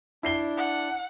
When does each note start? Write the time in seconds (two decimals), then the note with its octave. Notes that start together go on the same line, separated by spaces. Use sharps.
0.23 D4 E4 C7 G7
0.57 F#5